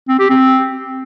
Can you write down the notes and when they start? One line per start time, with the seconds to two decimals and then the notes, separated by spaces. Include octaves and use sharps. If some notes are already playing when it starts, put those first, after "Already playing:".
0.09 C4
0.19 G4
0.30 C4